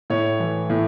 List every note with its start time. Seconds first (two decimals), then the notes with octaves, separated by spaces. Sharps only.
0.10 A2 C#5
0.40 E3
0.70 A2